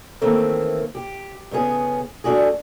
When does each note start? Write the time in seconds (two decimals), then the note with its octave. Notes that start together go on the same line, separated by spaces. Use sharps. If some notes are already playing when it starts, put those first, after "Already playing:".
0.21 D#3 E3 A3 A#3 C4
0.95 G4
1.51 A2 C#3 B3 G#4
2.24 A3 D4 F#4 G#4